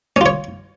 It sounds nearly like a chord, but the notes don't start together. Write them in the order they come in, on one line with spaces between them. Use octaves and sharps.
C#4 F4 C#5